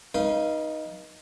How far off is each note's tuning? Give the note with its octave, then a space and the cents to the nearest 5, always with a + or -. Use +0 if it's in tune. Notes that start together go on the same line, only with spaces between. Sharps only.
D#4 +0 B4 -40 F5 -15